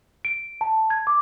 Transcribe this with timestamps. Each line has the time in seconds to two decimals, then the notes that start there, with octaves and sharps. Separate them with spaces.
0.25 D7
0.61 A5
0.90 G#6
1.07 D6